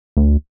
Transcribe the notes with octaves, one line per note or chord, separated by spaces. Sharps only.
D2